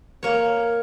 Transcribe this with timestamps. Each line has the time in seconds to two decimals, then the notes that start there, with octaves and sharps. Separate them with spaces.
0.23 A#3 C#5